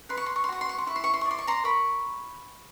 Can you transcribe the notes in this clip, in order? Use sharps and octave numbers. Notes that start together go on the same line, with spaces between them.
B4 C6
C#6
C6
C#6
C6
F#4 C#6
C6
C#6
C6
E4 C#6
C6
C#6
C6
C#6
D5
C6
C#6
A#5 C6
A#4 B5 C#6